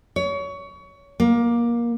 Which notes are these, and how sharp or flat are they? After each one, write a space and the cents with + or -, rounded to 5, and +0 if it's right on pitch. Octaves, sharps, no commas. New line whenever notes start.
C#5 +25
A#3 +20